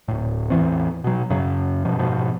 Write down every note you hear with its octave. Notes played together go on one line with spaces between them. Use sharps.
D1 A2
A1 E2 E3 C4
B2 F#3
F#2 C#3 F#3
F#2 B2 F3
G#2 B2 F3